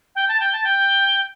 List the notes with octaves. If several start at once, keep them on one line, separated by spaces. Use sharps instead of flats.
G5
A5
G5
A5
G5